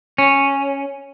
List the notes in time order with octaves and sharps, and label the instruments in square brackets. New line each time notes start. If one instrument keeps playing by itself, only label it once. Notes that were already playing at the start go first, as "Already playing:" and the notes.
[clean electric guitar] C#4